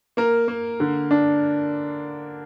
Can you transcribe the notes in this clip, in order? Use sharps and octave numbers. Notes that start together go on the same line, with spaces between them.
A#3 A#4
A#3
D3
D4